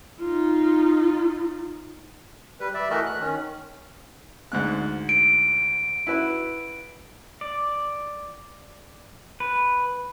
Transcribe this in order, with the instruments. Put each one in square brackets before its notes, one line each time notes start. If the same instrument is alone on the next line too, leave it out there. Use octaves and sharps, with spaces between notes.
[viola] D#4 F4
[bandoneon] G3 B4
D5 E5
E3 A3 F#4 A#4 D#5 E5
F#6
D#3 C#4
[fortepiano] D2 G#2 F#6
[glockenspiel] D7
[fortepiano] E4 F#4 B4
[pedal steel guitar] D5
B4